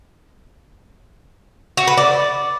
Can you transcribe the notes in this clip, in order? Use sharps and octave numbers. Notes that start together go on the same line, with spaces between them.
F#4
B4
D5